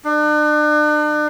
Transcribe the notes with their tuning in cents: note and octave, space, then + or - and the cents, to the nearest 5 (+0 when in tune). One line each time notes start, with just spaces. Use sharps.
D4 +40